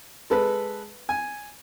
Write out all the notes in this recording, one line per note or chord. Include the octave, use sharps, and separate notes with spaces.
G#3 A4 B4
G#5